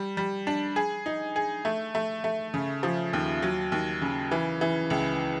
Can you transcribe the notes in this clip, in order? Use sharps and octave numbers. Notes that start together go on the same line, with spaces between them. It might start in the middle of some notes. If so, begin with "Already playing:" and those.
Already playing: G3
G3
D4
G#4
D#4
G#4
A3
A3
A3
C#3
F3
D#2
F#3
D#2
C#3
E3
E3
C#2